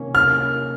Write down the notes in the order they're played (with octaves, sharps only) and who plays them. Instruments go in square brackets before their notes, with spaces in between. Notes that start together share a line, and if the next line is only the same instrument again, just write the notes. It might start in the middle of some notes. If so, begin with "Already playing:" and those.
Already playing: [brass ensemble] C3 D#3 A#3 C#4
[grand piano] F6